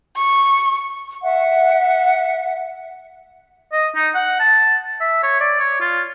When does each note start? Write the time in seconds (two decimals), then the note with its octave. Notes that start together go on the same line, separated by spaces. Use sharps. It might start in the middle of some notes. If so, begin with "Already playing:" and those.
0.17 C#6
1.21 E5 F#5
3.72 D#5
3.95 D#4
4.15 F#5
4.40 A5
5.00 E5
5.23 C#5
5.40 D5
5.60 C#5
5.81 F4